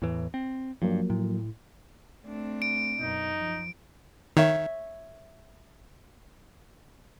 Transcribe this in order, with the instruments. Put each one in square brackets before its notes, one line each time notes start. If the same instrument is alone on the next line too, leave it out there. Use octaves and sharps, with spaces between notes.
[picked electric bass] E2 A2 E3
C4
[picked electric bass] G2 [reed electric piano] F3 F#3 A#3
[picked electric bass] A2
[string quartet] A3 C4 D4
[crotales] D7
[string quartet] F#2 B2 [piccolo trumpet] D#4
[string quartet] F3
[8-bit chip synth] D#3 [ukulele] C#5 E5